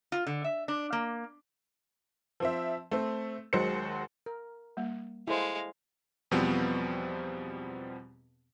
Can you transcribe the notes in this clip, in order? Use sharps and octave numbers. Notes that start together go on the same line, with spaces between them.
F4
D3
E5
D4
A#3
F3 C4 E5
A3 C4
D#2 F#3 G#3 C5 C#7
A#4
G3 A#3
G#3 E4 A4 C5 F5
E2 B2 F3 G3 B3 C4